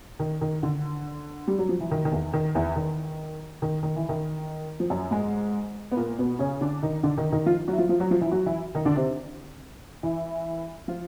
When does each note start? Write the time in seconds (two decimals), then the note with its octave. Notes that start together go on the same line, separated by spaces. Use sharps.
0.19 D#3
0.41 D#3
0.63 D3
1.48 G3
1.58 F#3
1.69 F3
1.80 E3
1.91 D#3
2.05 D#3
2.12 E2 E3
2.33 D#3
2.55 E2 E3
2.76 D#3
3.62 D#3
3.83 D#3
3.96 E3
4.09 D#3
4.80 F3
4.90 F#2 F#3
5.11 G#2 G#3
5.91 B3
5.97 A#2 A#3
6.19 B2 B3
6.39 C#3 C#4
6.61 D3 D4
6.82 D#3 D#4
7.03 D3 D4
7.18 D#3 D#4
7.32 D#3 D#4
7.46 F3 F4
7.68 F#3 F#4
7.73 E4
7.78 F3 F4
7.89 F3 F4
8.00 F#3 F#4
8.11 F3 F4
8.21 E3 E4
8.31 F#3 F#4
8.46 E3 E4
8.75 D#3 D#4
8.85 D3 D4
8.96 C3 C4
10.03 E3 E4
10.88 F3 F4